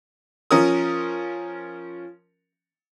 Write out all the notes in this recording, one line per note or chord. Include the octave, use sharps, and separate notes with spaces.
F3 C#4 A#4 D#6